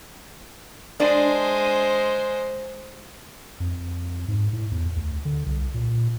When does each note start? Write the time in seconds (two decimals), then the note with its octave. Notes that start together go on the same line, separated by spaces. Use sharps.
1.00 G#3 D4 C5 D5
3.60 F2
4.28 G#2
4.53 A2
4.71 E2
4.97 D2
5.25 D3
5.46 C2
5.74 A#2